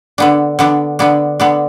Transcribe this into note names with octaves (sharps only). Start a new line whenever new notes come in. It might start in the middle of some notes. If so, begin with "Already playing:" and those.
D3 B3 D4
D3 B3 D4
D3 B3 D4
D3 B3 D4